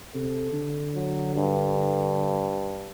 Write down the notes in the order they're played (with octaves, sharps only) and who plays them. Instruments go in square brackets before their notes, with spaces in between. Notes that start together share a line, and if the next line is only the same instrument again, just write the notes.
[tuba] C3 [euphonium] A4
[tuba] D3
[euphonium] F#3
G2